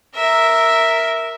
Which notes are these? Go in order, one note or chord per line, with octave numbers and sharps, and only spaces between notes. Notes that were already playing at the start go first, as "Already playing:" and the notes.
A#4 E5